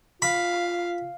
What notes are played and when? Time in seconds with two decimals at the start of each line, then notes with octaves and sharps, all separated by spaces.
0.22 F4 F5 B5